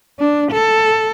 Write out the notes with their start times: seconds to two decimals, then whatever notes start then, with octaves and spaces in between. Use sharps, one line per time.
0.20 D4
0.52 A4